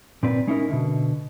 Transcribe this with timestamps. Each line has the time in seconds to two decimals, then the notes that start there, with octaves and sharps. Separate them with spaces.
0.23 A#2 C4 B4 D5
0.47 G#3 C#4 D#4 E4 A4 A#4
0.70 B2 D3